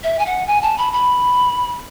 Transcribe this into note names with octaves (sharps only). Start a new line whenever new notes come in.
E5
G#5
F#5
G#5
A5
B5
B5